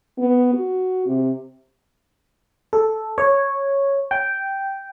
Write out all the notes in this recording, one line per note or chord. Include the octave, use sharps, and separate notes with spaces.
B3
F#4
C3
A4
C#5
G5